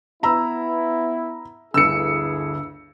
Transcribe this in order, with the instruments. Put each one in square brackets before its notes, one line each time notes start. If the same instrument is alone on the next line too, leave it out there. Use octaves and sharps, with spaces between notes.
[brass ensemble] B3 E4 [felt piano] A#5 B5 E6
[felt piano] G1 D2 G2 [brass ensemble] E4 G#4 [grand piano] E6 C#7